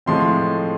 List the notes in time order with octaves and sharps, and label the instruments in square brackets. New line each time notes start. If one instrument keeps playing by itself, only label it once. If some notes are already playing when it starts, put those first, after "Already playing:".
[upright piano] A2 F3 G#3 C4 C6